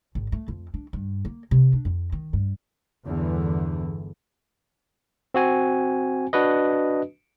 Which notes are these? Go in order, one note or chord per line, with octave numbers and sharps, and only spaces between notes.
G#1
A3
F2
D4
G2
A#3
C3
D4
F2
D#3
G2
G1 E2 D3 E3
C4 F#4 G#5
D4 F#4 B4 D#5